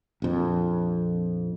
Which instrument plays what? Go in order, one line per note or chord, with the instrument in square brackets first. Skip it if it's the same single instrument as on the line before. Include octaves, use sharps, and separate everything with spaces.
[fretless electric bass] A#1 F2